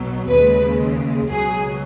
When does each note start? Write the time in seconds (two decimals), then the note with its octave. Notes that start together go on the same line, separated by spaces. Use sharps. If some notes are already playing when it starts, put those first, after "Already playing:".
Already playing: B1 B2 F#3
0.27 D#2 C#3 G#3 B4
1.29 C#2 B2 F#3 G#4